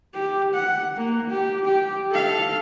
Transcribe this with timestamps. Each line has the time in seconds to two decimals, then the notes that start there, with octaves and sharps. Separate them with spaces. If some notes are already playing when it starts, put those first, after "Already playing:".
0.14 G4
0.54 F#5
0.96 A#3
1.30 G4
1.65 G4
2.11 A4 F5